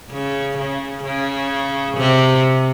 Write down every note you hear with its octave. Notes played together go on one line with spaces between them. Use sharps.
C#3
C#3
C#3
C3